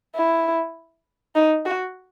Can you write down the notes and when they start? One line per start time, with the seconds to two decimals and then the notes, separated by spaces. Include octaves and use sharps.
0.15 E4
1.36 D#4
1.65 F#4